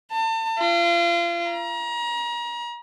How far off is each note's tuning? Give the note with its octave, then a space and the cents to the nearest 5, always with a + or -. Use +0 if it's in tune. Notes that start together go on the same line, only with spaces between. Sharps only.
A5 +35
F4 -30
A#5 +35